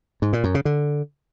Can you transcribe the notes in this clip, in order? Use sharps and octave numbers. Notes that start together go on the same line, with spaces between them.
G#2
A#2
F#2
C#3
D3